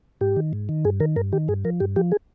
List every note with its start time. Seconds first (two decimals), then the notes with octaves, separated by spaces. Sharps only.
0.21 G#2 G4
0.36 D#3
0.53 G#2
0.69 D#3
0.85 G2 G#4
1.00 D#3 A#4
1.16 G2 A#4
1.32 D#3 G4
1.48 G2 G#4
1.65 F3 A#4
1.80 G2 G4
1.96 F3 G4
2.12 G#4